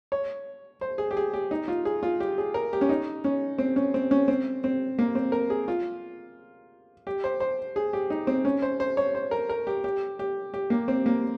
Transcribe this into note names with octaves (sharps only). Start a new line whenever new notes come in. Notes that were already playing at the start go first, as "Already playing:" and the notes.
C#5
C5
G#4
G4
G#4
G4
D#4
F4
G#4
F4
G4
G#4
A#4
G4
C#4
D#4
C#4
C4
C#4
C4
C#4
C4
C4
A#3
C4
A#4
G#4
F4
G4
C5
C5
G#4
G4
D#4
C4
C#4
C5
C5
C#5
C5
A#4
A#4
G4
G4
G4
G4
A#3
C4
A#3